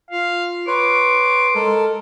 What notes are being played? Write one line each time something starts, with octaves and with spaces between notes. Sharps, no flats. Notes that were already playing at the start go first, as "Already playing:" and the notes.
F4 F5
B4 C#5 C6 D6
G#3 A4 A#4